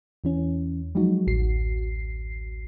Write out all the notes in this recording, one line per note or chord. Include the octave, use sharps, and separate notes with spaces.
E2 E3 C#4
F3 F#3 G#3 D#4 F#4
A1 D2 F#4 C7